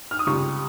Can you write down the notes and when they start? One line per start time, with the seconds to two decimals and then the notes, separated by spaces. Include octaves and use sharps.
0.11 F6
0.19 D#6
0.27 C#2 C3 G3 C#6